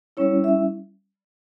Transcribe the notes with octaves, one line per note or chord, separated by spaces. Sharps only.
G3 C#4 E4 C#5
E5